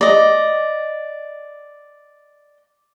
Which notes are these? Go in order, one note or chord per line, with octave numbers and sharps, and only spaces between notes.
D5 D#5